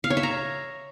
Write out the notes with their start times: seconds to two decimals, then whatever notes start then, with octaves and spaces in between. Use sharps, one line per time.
0.04 F5
0.10 C#5
0.17 E5
0.23 A#5